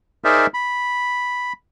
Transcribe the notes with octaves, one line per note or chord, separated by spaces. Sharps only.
D#4 G#4 A#4 C5 D5 E5
B5